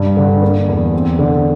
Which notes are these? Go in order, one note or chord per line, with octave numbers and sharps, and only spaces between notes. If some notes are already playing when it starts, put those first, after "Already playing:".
Already playing: G2
D3
A#3
E2
C4
D3